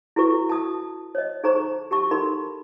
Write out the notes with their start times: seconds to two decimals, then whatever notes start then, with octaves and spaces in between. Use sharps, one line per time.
0.16 E4 F#4 G#4 A4 B4 C#6
0.49 A5 D#6
1.15 C#5 D#5
1.43 D#4 G#4 A4 C5 A#5 C#6
1.91 G4 A5 C#6
2.11 D#4 A4 A#4 B5 C6